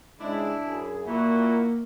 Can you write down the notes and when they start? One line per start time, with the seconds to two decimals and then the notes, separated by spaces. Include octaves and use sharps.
0.20 G#2 C#3 G#3 D4 E4
0.64 F#2 G#4
1.06 A#2 A#3 E4 F#4